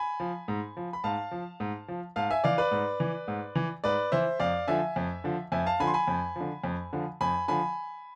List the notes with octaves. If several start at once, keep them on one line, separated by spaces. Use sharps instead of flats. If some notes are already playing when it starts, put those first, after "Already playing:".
Already playing: G#5 B5
F3
G#2
F3
B5
G#2 F5 A5
F3
G#2
F3
G#2 F5 A5
E5 G#5
E3 D5 F5
B4 D5
G#2
E3
G#2
E3
G#2 B4 D5
E3 C5 E5
F2 D5 F5
D3 F3 E5 G#5
F2
D3 F3
F2 E5 G#5
F5 A5
D3 F3 G#5 B5
C6
G#5 B5
F2
D3 F3
F2
D3 F3
F2 G#5 B5
D3 F3 G#5 B5